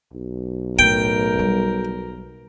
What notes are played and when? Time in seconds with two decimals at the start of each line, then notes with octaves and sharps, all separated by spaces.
0.12 B1
0.79 A2 A#4 G5
1.39 G3